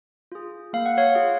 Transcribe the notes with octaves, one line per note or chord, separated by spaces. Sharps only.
F4 G#4
A#3 F5
F#5
C#5 F5
F4 G#4